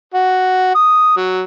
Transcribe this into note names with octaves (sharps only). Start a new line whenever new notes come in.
F#4
D#6
F#3